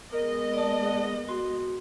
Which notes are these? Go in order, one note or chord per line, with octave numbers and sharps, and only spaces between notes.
G#3 B3 A#4 D#5
A#3 D5 A5 D#6
F#5
F#4 C6